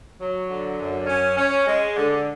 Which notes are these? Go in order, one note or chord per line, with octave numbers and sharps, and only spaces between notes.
F#3
D3
F#2
C#4
C#4
G#3
D3